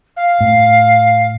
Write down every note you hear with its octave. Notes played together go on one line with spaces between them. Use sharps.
F5
A2